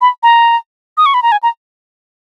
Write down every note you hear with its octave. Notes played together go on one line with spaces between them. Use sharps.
B5
A#5
D#6
C#6
B5
A#5
G#5
A#5